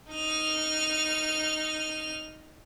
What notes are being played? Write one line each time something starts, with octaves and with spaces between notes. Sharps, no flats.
D#4 F6